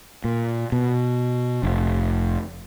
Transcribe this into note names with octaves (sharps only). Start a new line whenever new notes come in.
A#2
B2
F1